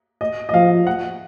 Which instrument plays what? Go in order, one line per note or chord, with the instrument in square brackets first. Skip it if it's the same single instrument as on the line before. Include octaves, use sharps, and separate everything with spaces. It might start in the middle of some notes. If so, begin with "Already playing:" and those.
[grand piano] D#5
D#5
[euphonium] F3 [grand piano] F5
[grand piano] F#5